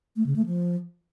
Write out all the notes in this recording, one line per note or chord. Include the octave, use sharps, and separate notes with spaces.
A3
C#3
A3
F3